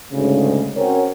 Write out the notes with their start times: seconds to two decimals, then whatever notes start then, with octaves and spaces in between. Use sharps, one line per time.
0.12 D2 G#2 C#3
0.77 C4 C#4 F#4 A#4 C5 C#5